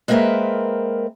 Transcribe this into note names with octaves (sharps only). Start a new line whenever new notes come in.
G#3 A#3 C4 A#4 B4 E5